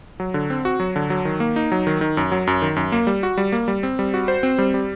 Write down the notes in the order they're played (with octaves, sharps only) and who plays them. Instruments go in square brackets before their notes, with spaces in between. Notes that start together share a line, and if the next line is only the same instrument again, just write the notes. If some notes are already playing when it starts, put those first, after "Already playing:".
[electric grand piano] F#3
D3
C4
F#4
F#3
D3
F#3
D#3
A#3
D#4
F#3
D#3
D#3
F#2
F#3
F#2
D#3
F#2
A#3
G3
F#4
G3
A#3
G3
C4
G3
F#4
C5
C4
G3
G3